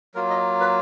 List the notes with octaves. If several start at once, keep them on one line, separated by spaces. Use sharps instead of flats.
F#3 A#3 F4 A#4
D#5
B4